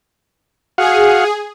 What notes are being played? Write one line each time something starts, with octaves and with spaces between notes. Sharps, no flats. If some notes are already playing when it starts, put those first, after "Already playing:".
F#4 G#4 F5 F#5